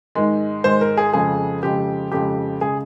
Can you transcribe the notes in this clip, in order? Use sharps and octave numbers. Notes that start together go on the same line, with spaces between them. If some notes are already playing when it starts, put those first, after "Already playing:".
G#2 D#3 G#3
G#2 D#3 G#3 C5
A#4
G#4
F2 C#3 G#3 G#4
F2 C#3 G#3 G4
F2 C#3 G#3 G4
C#3 G#3 G#4